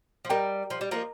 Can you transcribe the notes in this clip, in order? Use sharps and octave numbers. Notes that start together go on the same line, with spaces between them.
F3
G3 A#4 D#5 G5 A#5
F3
G3
F3 A#3 A#4 D#5 A#5